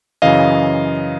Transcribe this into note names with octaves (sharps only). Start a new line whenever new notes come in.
F#2 C#3 E3 D#5 F5